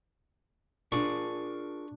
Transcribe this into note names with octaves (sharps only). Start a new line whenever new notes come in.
D4 F4 G#4 A#4 C#6